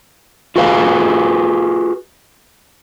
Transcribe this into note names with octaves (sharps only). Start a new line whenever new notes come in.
F4 F#4 G#4 B4 E5 F5